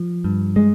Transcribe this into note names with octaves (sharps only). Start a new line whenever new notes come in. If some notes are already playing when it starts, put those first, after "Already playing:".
Already playing: F3
G2
G#3